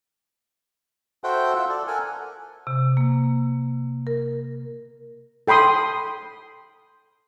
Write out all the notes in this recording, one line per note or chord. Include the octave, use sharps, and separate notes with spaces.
F#4 A4 C5 E5 F#5 G5
F4 E5 F#5
A4 D5
A4 A#4 F#5 G#5
C3
A#3
A#4
A4 G5 B5 C6 D#6